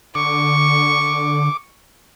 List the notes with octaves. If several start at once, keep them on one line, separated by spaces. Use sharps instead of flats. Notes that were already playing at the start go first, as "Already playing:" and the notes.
D3 C#6 D6